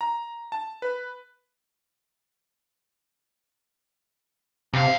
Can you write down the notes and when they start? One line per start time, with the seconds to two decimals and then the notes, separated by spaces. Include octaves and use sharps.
0.01 A#5
0.52 A5
0.82 B4
4.73 D#2 C3 F5